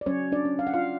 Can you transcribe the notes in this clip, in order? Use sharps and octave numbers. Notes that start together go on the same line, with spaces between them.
D5
F#3 C#4 C#5
D4 D5
C#4
F5
F#5
F4 F5